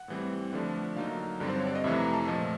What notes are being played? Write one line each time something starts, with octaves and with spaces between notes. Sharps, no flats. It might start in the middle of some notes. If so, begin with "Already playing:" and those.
Already playing: F#5
A2 E3 G3 C4
D3 F3 A3 D4
D3 F#3 A#3 D#4 F5
G2 D3 G3 C4
C5
C#5
D5
D#5
F2 C3 E3 A3 E5
A#5
A5
A#2 F3 A3 D#5